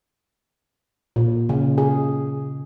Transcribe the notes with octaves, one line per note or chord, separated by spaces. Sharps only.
A#2
C#3
G#4